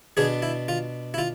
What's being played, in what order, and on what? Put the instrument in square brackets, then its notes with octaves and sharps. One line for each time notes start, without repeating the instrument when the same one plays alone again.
[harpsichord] B2 B3 D4 G#4
E4
F4
E4
F4